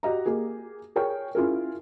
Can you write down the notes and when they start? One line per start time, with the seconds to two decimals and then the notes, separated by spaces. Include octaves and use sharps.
0.03 F#4 G4 D#5 A#5
0.26 A#3 G4 G#4
0.96 G#4 A#4 C#5 G5 C#6
1.35 C#4 E4 F4 G#4 A#4